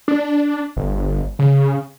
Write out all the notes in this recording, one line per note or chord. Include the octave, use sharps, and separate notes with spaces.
D4
G1
C#3